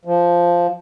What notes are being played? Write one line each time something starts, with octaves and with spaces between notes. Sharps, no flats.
F3